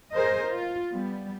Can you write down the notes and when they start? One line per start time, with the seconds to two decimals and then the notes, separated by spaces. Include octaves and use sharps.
0.12 G#4 A#4 C5 D#5
0.47 F4
0.91 G3 B3